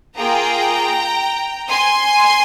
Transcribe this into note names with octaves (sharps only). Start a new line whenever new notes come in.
A#3 F4 G#4 G5 A#5
G#5 C6